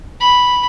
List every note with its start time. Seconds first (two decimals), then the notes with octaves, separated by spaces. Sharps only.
0.20 B5